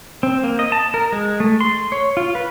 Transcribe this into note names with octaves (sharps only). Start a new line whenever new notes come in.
C4
A#3
D#5
A5
A#4
G#3
A3
C6
C#5
F4
B4